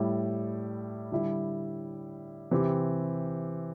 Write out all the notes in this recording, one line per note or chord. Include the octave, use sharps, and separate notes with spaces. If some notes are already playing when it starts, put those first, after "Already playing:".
Already playing: A2 G3 E4
D3 G3 E4
C3 E3 C4 G4